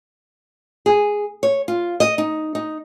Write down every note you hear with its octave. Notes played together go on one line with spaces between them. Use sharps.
G#4
C#5
F4
D#5
D#4
D#4